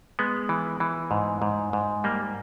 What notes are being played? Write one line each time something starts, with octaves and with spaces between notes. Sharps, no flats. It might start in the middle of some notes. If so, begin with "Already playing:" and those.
G#3 B3
E3
E3
G#2
G#2
G#2
G3 A#3